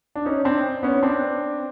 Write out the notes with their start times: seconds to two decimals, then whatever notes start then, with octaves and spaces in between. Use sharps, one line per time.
0.15 D4
0.25 C#4 D#4
0.44 C4 D4
0.83 B3 C#4
1.03 C4 D4